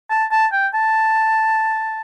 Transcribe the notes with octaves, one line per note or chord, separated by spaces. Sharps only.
A5
A5
G5
A5